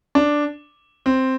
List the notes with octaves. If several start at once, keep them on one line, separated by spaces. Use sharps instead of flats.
D4
C4